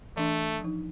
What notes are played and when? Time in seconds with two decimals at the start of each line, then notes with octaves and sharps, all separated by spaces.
0.17 E3 A3 D4
0.60 F3 D#4